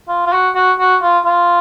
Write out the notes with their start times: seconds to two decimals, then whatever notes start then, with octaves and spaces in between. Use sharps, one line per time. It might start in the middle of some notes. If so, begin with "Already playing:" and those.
0.08 F4
0.26 F4
0.33 F#4
0.55 F#4
0.79 F#4
1.02 F4
1.26 F4